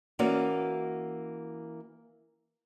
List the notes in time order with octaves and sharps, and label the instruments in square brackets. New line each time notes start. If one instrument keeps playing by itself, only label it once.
[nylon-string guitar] E3 A#3 C#4 F#4 D5